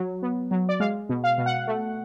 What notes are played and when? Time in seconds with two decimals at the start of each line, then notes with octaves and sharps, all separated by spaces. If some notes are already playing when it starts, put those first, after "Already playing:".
Already playing: F#3
0.22 B3
0.51 F#3
0.69 D5
0.80 G#3 F5
1.09 B2
1.24 F5
1.38 B2
1.46 F#5
1.67 A3